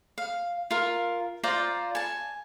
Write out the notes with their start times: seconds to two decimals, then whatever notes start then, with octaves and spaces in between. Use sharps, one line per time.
0.18 F5
0.71 F4 A#4
1.43 F4 C5 D5 A#5
1.95 G#5 A5